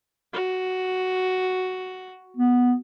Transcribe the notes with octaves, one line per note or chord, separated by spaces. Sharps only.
F#4
B3